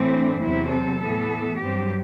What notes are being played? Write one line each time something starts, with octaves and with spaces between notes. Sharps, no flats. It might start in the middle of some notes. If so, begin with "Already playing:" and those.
Already playing: A2 E3 A3 C4
D4
E2 C3 F#3 C4 E4
A4
A2 E3 B3
G2 F#3 C4 G4